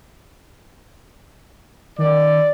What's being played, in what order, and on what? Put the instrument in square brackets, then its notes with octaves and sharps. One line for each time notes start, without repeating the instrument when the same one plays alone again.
[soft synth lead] D#3 [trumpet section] D5